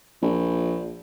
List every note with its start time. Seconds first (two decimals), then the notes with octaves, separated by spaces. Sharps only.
0.22 A#1